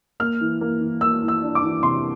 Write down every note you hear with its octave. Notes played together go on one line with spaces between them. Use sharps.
A#3 F6
E3
A#3
E3
A#3 E6
E3
E6
D4
D6
E3
C3 C6